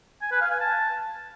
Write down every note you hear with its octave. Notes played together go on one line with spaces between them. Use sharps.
G#5
B4
F5
G#5
A5